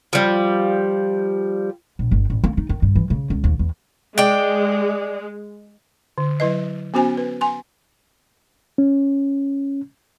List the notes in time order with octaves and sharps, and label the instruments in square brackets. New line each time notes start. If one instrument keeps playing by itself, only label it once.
[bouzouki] F3 G3
[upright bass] A#1
G1
A1
A#3
D#4
D#3
G2
E3
C#3
C#2
D#2
E2
[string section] G#3 [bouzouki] D5 G5
[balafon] D3
F#3 E4 B4 D#5
B3 C#4 F#4 C5 G#5
B4
G#5 C6
[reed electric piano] C#4